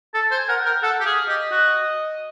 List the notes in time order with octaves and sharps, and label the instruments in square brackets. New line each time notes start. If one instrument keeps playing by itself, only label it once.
[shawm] A4 [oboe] A5
[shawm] C5
[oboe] G#5
[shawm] A#4 [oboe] F#5
[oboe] G5
[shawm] A#4
[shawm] A4 [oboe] F#5
[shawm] G4
[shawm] G#4 [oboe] F5
[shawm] G4 [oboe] D#5
[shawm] F#4